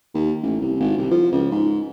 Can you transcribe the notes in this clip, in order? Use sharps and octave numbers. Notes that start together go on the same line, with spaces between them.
D#2
A1
C2
G#1
C2
F3
C#2
G#2